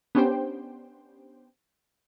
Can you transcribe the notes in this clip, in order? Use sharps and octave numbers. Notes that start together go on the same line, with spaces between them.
B3 C#4 D4 G4 C5 G5